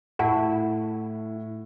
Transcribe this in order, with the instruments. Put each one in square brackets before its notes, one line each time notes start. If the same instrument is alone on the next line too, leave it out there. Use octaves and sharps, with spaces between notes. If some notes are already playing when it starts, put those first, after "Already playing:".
[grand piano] A2 [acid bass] E4 [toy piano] G4 F#5 A5